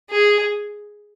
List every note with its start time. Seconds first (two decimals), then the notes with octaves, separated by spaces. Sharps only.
0.10 G#4